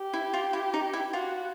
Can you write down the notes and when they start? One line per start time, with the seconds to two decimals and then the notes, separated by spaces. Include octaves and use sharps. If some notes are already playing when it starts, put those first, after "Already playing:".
Already playing: G4
0.14 E4
0.33 F4
0.53 E4
0.74 D#4
0.93 E4
1.13 F4 F#4